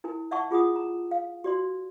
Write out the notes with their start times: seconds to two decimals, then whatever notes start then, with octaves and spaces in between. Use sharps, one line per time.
0.04 E4 A#4 G#5
0.31 D5 E5 F#5 A5 C#6
0.51 F4 G#4 F#5 D#6
0.76 A#5
1.11 F5
1.44 F#4 D5 C6